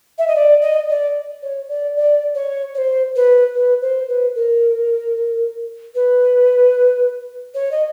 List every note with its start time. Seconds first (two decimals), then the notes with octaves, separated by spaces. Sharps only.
0.18 E5
0.28 D#5
0.36 D5
0.62 D#5
0.89 D5
1.43 C#5
1.69 D5
1.96 D5
2.35 C#5
2.75 C#5
2.78 C5
3.16 B4
3.55 B4
3.81 C5
4.09 B4
4.35 A#4
5.95 B4
7.54 C#5
7.71 D#5